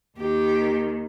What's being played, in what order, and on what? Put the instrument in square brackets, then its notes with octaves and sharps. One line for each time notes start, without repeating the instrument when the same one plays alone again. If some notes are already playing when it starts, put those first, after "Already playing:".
[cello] D#2 D#3 [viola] G4